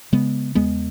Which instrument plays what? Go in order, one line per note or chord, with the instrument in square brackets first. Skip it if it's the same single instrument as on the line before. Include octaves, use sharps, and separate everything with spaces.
[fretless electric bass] C#3 G#3 B3
E2 G#3 B3